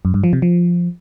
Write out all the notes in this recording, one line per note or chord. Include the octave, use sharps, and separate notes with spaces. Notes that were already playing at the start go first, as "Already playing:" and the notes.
F#2
G2
F3
C3
F3